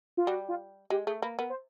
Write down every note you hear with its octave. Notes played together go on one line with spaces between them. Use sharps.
F4
G3 F#4
F4
G#3 G4
A3 G#4
A#3 B4
B3 A#4
C5